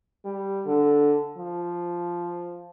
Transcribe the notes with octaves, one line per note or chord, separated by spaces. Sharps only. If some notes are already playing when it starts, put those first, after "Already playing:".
G3
D3
F3